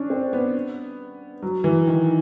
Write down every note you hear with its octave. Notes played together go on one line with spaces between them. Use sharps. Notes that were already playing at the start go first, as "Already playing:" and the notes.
Already playing: C#4 D4
C4
B3
F#3
E3
D#3